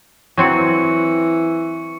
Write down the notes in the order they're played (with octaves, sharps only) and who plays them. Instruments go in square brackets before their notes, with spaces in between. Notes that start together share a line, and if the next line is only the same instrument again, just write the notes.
[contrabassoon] E3 [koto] F#3 C4 F#4 [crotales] C#6 C#7